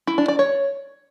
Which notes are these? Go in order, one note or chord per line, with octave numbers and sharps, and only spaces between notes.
E4
D4
D5
C#5